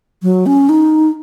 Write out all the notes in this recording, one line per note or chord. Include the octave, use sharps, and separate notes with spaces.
F#3
C#4
D#4